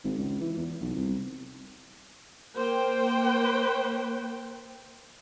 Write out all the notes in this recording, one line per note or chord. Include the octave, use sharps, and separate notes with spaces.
G#1
C#2
E3
E2
B1
C2
A#3 C5 G5